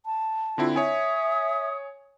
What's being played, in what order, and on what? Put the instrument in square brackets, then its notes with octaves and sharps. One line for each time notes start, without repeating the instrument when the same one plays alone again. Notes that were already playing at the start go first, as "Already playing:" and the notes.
[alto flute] A5
[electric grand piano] D3 C4 E4 [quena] F4
[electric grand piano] C#5 G#5 [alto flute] E5 [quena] D#6